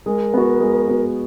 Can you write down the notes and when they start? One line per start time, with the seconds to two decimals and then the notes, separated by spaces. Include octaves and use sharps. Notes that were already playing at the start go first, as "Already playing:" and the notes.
0.06 G#3 A#4
0.34 B3 F#4
0.60 G#3
0.88 B3 F#4